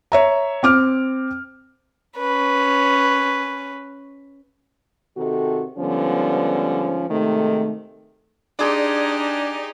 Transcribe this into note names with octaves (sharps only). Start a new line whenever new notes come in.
C#5 E5 A#5
C4 D6 F6
C#4 B4
C3 D#3 F#4 A4
G#2 D3 F3 G3 B3 C#4
G#2 C3 D#3 A3
D4 D#4 G4 G#4 D5 C6